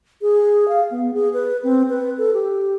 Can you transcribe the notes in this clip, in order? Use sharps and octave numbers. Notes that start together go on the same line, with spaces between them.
G#4
F5
B3
G#4
B4
C4
B4
A4
G4